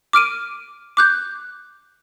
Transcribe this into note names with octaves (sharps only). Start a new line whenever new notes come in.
D6 F6 D7 D#7
D6 F#6 G6